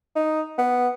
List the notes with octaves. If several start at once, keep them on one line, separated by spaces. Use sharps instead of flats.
D#4
B3